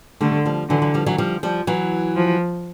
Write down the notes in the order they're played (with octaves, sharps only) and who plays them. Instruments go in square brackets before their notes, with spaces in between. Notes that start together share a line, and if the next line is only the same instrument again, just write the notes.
[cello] D3 [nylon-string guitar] G3 A3
[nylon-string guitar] F3 G3
[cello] D3 [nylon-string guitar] E3 F#3
[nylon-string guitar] E3 F#3
F3 G3
E3 F#3
F3 G3
F3 G3
E3 F#3
[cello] F3